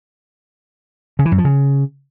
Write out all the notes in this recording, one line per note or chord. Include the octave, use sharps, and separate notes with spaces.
C#3
E3
F#2
F3
C#3